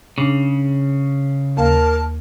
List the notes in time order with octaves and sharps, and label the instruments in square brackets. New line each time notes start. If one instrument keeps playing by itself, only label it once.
[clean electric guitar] C#3 [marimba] D4
[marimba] D#2 A#3 F5 [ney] A#4 [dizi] A5